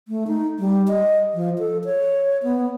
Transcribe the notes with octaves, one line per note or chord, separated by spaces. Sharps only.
A3
D#4
G3
D#5
F3
A4
C#5
B3